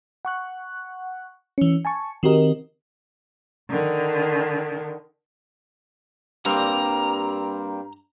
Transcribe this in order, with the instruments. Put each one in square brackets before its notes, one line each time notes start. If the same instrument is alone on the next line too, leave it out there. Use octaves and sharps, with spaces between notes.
[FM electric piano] F#5 C#6 F#6
E3 C#4
G#5 A5 C#6
D#3 C4 F#4 G4 A#4 D#5
[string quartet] D3 D#3
[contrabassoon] G2 [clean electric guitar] G3 A#3 C4 [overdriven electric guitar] A#5